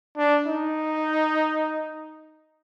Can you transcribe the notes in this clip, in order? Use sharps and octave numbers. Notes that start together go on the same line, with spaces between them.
D4
D#4